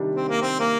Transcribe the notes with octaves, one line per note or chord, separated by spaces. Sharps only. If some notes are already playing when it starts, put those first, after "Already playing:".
Already playing: C3 D#3 G3 D4
C4
A#3
C4
A#3